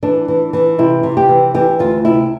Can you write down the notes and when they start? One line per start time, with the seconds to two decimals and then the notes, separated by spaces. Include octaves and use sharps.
0.03 E3 D4
0.28 E3
0.53 E3
0.78 C3 E4
1.03 C3
1.17 G4
1.29 E3
1.55 E3 G4
1.79 D2 F4
2.05 C3 E4